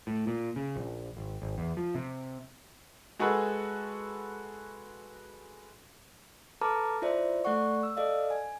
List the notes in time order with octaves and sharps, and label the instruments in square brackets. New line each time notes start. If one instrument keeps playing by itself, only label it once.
[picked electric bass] A2
A#2
C#3
A#1
G#1
G#1
E2
F3
C3
[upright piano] G#3 F#4 G#4 A4 B4
[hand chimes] A4 B4 A5 A#5 D6 F6
E4 F4 C5 D5 E5
A3 A4 D5 F#5 C#6
E6
A4 D5 D#5 F5
G#5